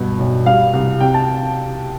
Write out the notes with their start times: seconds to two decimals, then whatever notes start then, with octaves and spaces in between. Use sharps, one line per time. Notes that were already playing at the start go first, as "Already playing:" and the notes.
Already playing: G2 B2
0.19 B1
0.46 G3 F5
0.73 C2
1.00 C3 G5
1.14 A5